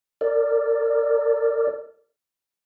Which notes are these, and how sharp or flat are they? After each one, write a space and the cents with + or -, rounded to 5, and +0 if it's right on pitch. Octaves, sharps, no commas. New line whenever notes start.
A#4 -35 D5 +0